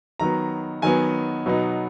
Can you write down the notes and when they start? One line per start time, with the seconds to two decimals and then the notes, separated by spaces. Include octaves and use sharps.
0.20 D#3 F#3 B3 A#5
0.82 D#3 F#3 B3 G#5
1.46 B2 F#3 B3 D#4